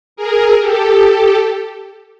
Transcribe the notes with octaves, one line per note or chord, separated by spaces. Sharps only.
G#4 A#4
G4 A4